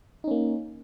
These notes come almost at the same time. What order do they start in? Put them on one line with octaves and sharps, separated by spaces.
D#4 C#4 A#3